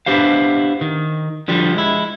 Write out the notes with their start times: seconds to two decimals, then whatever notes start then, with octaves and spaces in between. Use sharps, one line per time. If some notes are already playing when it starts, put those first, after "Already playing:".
0.06 B3 D4 E4 G4 C5 F5
0.81 D#3
1.48 D3 F3 G3
1.75 G#3 E4